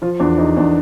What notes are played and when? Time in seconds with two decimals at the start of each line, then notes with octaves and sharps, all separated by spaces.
0.02 F3 F4
0.20 E2 D4
0.38 E2 D#4
0.57 E2 D4